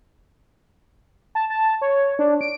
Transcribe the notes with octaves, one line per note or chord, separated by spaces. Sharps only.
A5
A5
C#5
D4
D7